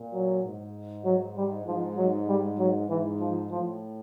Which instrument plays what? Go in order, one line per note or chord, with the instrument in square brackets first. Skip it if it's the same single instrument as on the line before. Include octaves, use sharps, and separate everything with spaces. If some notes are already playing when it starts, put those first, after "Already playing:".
Already playing: [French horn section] A#2
[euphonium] F#3
[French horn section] G#2
[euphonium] F#3
G3
[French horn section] G#2 [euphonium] F3
[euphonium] F#3
G3
F#3
[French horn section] G#2 [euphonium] E3
[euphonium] F3
[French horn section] A2 [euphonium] F3